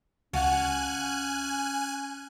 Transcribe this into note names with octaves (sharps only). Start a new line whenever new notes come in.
C#2 C#4 F#4 F5 G#5 A5 F#6